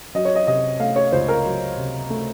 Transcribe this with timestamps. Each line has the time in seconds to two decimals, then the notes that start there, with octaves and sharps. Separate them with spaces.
0.15 F#3 D#5
0.25 C#5
0.35 D#5
0.47 C3 D#5
0.80 A3 F5
0.96 C#5
1.12 C#2 C5
1.28 A#4
1.45 F#3
1.77 C3
2.10 A3